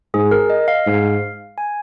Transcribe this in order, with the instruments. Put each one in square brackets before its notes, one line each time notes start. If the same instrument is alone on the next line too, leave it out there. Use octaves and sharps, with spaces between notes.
[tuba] G#2 [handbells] G#4
[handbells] A#4
D#5
F5
[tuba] G#2
[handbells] G#5